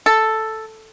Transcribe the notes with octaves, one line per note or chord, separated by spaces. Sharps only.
A4